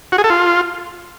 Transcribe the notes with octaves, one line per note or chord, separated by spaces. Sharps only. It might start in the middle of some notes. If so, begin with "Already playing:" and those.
F#4
G#4
A4
F4